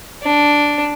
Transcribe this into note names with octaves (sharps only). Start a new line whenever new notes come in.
D4